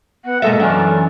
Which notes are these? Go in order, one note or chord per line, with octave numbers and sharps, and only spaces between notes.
B3 F#5
B2 G#3 A#3 A4 E5
F#2 E3 C#4 D5 E5